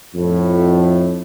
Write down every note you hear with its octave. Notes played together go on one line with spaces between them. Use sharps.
F2 A2